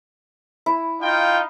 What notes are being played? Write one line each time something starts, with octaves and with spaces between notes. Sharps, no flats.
E4
D#4 F4 F5 G5